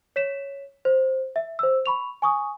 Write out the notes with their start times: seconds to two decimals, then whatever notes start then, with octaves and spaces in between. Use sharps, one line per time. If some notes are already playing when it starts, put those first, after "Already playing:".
0.16 C#5 B6 E7
0.85 C5
1.36 E5
1.59 C5 E6
1.86 B5 C#6 F7
2.22 G#5 C#6 D#6